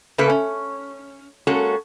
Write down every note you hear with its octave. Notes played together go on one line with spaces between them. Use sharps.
C#3 A3 A#3 A4 B4
C#4
G#3 A#3 C#4 F#4 A4